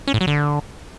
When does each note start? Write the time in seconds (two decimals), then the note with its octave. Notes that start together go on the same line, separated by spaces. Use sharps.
0.07 C#4
0.14 A2
0.21 F#3
0.27 D3